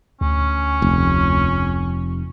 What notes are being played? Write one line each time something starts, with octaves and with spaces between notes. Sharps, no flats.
D2 C#4
F1